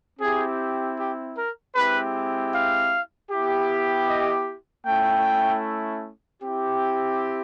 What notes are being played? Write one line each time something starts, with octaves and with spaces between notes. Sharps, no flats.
C4 E4 G4 G#4
G4
A#4
G#3 C4 E4 G4 B4
F5
B3 E4 G4
D#5
A3 C#4 E4 G5
C4 E4 G4